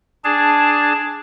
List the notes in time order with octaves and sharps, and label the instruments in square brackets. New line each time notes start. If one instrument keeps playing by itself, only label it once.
[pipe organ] D4 G#4 A5